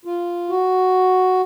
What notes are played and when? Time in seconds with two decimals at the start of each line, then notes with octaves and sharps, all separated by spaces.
0.05 F4
0.50 F#4